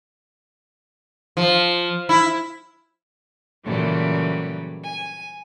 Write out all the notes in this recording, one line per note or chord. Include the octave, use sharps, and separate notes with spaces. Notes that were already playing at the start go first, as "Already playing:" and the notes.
F3
E4
A#2 C#3 E3 F#3 G3 A3
G#5